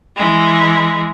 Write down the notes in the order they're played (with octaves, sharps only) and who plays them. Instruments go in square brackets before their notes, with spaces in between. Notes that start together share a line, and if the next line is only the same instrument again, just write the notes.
[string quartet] E3 G#3